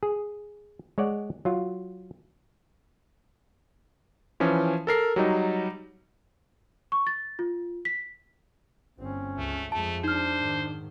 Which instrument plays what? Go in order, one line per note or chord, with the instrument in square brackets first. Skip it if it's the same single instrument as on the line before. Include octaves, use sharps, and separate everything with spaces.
[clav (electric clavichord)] G#4
G#3 C#5 D5 F#5
F#3 F4
[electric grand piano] E3 F3 C#4
A4 A#4 C7
F#3 G3 D#4
[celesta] C#6
A6
F4
B6
[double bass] G1 C4 [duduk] C#4
[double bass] C#2 [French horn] A3
[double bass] F2 G#3 [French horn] A3 [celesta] A5
[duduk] D4 [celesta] D#4 F6 [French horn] C5
[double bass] G#2 D#3